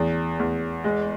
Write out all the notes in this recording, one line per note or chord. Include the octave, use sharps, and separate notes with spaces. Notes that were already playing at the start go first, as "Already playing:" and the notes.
Already playing: E2
E2
G#3